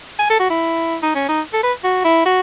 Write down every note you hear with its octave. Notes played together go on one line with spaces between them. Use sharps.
G#5
A4
F#4
E4
D#4
C#4
D#4
A4
B4
F#4
E4
F#4